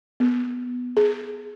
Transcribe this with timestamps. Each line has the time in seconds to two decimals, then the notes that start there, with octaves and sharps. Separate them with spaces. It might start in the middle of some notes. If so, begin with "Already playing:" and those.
0.20 B3
0.97 G#4